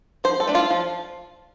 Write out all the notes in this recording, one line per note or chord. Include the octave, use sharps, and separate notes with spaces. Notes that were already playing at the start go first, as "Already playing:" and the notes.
F3 C5
A4
A3 D4
F4
F3